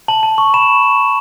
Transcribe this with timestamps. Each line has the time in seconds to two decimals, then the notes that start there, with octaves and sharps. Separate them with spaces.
0.08 A5 F#7
0.23 A5
0.38 C#6
0.54 B5 E7